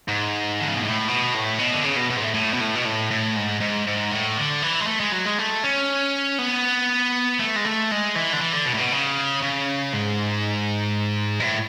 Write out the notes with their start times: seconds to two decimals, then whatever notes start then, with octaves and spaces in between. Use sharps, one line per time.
0.08 G#2
0.60 D3
0.68 C#3
0.75 B2
0.83 A2
1.08 B2
1.34 A2
1.59 B2
1.73 D3
1.84 C#3
1.96 B2
2.10 B2
2.17 G#2
2.22 A2
2.34 A2
2.53 B2
2.61 A2
2.75 B2
2.85 A2
3.11 A2
3.37 G#2
3.61 G#2
3.87 G#2
4.12 A2
4.37 D3
4.63 E3
4.80 G#3
4.87 A3
5.00 G#3
5.12 F#3
5.25 G#3
5.38 A3
5.64 C#4
6.38 B3
7.39 A3
7.56 G#3
7.65 A3
7.91 G#3
8.15 E3
8.33 D3
8.42 E3
8.53 D3
8.66 B2
8.74 A2
8.79 B2
8.92 C#3
9.43 C#3
9.93 G#2
11.40 B2
11.44 A2